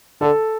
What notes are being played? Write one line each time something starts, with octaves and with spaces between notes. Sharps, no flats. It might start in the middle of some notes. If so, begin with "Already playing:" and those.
D3 A4